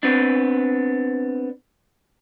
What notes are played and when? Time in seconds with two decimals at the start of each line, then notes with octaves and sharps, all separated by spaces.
0.03 B3 C4 D4